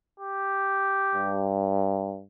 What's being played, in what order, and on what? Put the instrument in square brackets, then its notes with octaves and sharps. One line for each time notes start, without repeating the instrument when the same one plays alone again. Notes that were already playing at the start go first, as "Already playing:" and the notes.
[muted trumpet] G4
[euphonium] G2